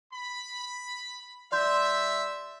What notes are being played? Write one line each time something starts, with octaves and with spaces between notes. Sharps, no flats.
B5
G3 D5 E5 C6 G6